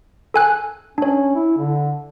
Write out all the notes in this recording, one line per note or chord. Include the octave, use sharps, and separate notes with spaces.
A4 G#5 F#6
C#4 D4 C#5
E4
D3